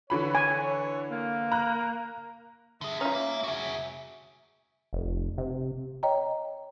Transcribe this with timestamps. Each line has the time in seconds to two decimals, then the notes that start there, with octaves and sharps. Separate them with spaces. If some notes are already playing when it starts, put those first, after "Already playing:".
0.10 D3 E3 C#5 B5
0.35 G#5
0.63 C#5
1.11 A#3
1.52 A#5 F#6
2.81 D3 G#4 E5
3.01 C#4 D#4 F4
3.15 A#3
3.44 F#4 G#4 E5
4.93 F1
5.38 C3
6.03 C#5 D#5 G5 A#5